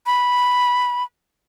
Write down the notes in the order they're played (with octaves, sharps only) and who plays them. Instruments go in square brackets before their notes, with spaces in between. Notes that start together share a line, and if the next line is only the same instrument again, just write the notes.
[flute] B5